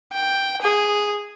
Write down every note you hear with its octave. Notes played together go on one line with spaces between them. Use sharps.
G5
G#4